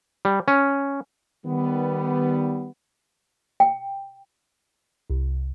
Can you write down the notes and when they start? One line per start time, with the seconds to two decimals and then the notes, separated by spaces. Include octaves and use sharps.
0.25 G3
0.48 C#4
1.45 D#3 G3 B3
3.60 G5
5.10 C2